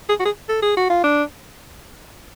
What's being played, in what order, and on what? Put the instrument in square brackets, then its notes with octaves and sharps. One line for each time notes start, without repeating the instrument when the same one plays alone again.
[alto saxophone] G#4
F#4
G#4
A4
G#4
F#4
F4
D4